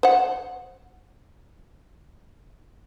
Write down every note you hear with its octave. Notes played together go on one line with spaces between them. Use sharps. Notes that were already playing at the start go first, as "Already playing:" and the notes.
C5 F#5